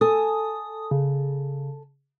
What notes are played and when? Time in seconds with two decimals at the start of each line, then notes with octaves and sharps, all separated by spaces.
0.01 A4 G#5 A5 D#6
0.91 C#3